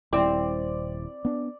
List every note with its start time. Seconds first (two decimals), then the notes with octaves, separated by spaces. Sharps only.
0.13 D#1 G3 C4 E4 D5
1.25 B3 D4